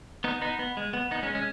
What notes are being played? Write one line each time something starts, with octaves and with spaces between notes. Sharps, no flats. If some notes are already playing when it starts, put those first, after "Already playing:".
B3 D#4
B3 D#4
B3
G#3
B3
B3 D#4
G#3 C#4
G#3 C#4